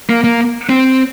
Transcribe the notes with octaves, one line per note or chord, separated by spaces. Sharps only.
A#3
A#3
C4